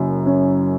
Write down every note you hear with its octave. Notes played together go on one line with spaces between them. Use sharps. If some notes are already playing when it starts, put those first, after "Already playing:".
Already playing: F#1 F#2
C#4